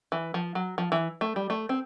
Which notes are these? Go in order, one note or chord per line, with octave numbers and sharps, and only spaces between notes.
E3
F3
F#3
F3
E3
A3
G3
A3
C4